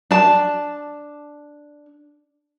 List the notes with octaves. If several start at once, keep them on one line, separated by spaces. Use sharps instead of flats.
D4 A5